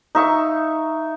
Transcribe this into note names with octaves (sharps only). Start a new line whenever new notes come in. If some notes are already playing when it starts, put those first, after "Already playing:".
D#4 E5 C#6